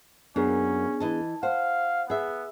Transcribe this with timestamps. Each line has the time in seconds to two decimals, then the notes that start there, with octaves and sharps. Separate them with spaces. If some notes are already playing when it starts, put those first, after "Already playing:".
0.36 F#2 A#3 B3 C#4 D4 G#4
1.00 E3 D#5 A5
1.43 C5 F5 F#5
2.10 B3 G#4 E5